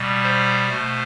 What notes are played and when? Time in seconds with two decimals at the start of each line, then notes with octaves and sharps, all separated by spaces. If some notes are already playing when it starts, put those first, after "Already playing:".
Already playing: B2 G3
0.23 C5
0.70 B2 A3